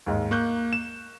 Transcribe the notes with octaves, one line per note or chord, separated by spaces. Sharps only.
D#2 G#2
A#3 C#6 F#6 G6
E7